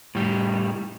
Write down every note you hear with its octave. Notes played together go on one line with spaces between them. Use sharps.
A2 G3